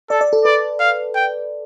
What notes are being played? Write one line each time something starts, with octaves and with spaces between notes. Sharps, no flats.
A4 D5
D5
A4
B4 D5
F5
G5